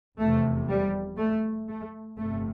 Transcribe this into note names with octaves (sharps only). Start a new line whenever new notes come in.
F1 E2 C3 A3
G3
A3
A3
G1 F2 C3 A3